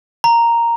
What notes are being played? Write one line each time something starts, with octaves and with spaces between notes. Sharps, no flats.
A#5